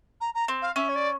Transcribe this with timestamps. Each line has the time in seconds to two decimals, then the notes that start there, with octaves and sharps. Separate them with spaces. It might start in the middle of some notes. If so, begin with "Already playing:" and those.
0.21 A#5
0.34 A#5
0.48 C4
0.62 F5
0.76 C#4 E5
0.89 C#5
0.95 D5